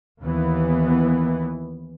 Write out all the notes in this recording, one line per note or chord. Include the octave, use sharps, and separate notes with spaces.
D#2 E3 B3